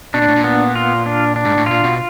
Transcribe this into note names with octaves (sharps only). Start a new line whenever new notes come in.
B2 D4
A#2
A2
A#2
B3
F4
D4
D4
G#2
A2
A#2 F4
B2